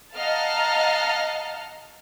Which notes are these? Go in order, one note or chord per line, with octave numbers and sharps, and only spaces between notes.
D#5 F5 F#5 A5 A#5 F6